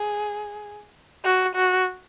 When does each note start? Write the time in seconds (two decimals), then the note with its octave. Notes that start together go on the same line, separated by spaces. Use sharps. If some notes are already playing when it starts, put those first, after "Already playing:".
Already playing: G#4
1.25 F#4
1.55 F#4